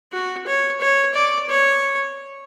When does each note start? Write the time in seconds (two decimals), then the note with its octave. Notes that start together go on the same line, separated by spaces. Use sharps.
0.12 F#4
0.46 C#5
0.80 C#5
1.14 D5
1.49 C#5